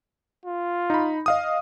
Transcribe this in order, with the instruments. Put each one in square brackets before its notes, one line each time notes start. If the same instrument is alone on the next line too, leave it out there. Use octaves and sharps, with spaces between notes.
[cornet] F4
[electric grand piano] D#4 B5
D#5 F5 D#6